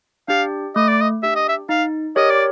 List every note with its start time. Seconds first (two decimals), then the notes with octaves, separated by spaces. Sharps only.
0.28 D4 G4 F5
0.76 A3 D#5
0.89 D5
1.01 D#5
1.23 D4 G4 E5
1.35 D#5
1.49 E5
1.69 D#4 F5
2.16 G4 A#4 C#5 D#5
2.30 D5